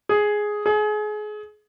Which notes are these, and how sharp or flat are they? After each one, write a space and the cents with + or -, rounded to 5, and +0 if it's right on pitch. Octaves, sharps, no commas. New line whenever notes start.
G#4 +5
G#4 +30